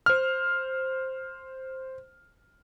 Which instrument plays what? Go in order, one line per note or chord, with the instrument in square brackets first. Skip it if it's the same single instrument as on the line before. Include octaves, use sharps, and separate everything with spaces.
[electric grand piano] C5 F6